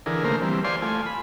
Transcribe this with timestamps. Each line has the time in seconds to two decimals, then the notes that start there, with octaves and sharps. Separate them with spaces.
0.06 D3 E3 G#4 A#4
0.24 C#3 A3 A#3 A#4 C5
0.42 E3 G3 C4
0.64 C5 D5 F5 G#5 C6
0.82 A3 F4 G#5
1.06 B5